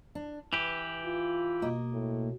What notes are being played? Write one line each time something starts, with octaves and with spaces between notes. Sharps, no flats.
D4
E3 G4 B4
F4
B2 A#3 D#5
A2